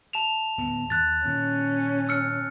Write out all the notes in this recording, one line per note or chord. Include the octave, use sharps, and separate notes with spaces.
A5 E7 F7
D1 D#2 B3
D#2 F#6 A6
A#2 D#3 C#4
E6 F6 C#7